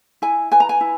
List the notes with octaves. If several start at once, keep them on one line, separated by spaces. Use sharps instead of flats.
E4 G#5
B4 G#5
A#5
G#5
E4